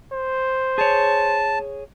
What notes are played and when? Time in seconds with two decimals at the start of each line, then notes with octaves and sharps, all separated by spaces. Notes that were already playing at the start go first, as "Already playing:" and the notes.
0.12 C5
0.78 G#4 C#5 A5